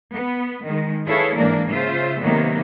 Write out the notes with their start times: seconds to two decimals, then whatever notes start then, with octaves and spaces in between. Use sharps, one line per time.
0.12 B3
0.63 D#3 G#3
1.06 E4 G#4 A4 B4 C#5 F5
1.36 G#2 E3 A#3 D4 A#4 D5
1.69 C#3 F4 C5 E5
2.21 C3 D#3 F#3 A#3 B3